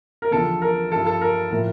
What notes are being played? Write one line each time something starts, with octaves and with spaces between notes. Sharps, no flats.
A#4
E2 D3 F3 A4
A#4
G2 F3 A4
A4
A#4
A2 F3 A#4